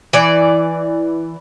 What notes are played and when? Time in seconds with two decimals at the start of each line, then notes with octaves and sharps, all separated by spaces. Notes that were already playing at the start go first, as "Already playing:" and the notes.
0.13 E3 D5